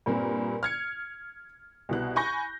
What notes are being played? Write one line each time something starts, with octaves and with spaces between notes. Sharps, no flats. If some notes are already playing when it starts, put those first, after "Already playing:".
G2 A#2 C4 A#4
F6 G#6 C#7
C2 B2 F#6
G#5 B5 C#6 G6 A#6